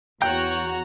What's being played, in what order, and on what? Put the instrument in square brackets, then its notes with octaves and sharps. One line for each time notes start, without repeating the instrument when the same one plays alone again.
[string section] E2 F#4 [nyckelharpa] C#5 F#5 [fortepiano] G5 [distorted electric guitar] A#5